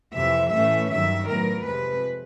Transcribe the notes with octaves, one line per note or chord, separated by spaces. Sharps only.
F2 C3 E3 E5
A2 E3 A3 C#4 E5
G2 D#3 F#3 E5
A2 F#3 B3 A#4
F2 C3 F3 G#3 B4